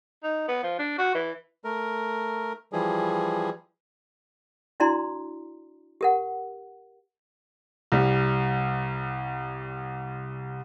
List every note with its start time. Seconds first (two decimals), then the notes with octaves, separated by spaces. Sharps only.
0.24 D#4
0.48 B3
0.64 F3
0.79 D4
0.99 F#4
1.15 E3
1.64 A3 A#4
2.73 E3 F3 G3 G#4
4.80 D4 E4 F#4 D5 A#5 C6
6.01 G4 A#4 F#5
7.92 C2 G3